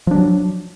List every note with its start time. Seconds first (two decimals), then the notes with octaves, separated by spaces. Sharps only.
0.07 F3
0.11 D4
0.15 F#3